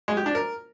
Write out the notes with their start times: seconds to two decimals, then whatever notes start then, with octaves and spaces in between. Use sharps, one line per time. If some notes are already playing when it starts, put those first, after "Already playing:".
0.08 G#3
0.17 G4
0.26 D4
0.35 A#4